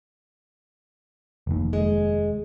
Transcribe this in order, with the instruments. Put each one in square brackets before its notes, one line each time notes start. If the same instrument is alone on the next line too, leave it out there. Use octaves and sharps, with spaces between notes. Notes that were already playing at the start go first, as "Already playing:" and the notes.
[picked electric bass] F1 D#2
[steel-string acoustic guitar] G#3